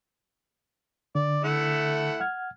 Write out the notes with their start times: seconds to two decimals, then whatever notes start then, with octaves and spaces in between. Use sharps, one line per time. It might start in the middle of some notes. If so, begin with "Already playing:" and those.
1.15 D3 D5
1.44 A3 E4 F#5
2.20 F#5 F6 G#6